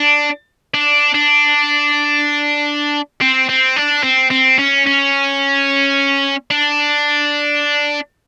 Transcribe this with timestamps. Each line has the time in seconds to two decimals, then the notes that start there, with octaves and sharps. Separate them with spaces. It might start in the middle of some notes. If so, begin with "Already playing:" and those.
Already playing: D4
0.74 D4
1.15 D4
3.21 C4
3.49 C4
3.76 D4
4.03 C4
4.30 C4
4.58 C#4
4.86 C#4
6.51 D4